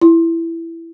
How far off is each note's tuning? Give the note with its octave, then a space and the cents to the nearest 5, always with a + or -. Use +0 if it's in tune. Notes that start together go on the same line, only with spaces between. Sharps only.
E4 +10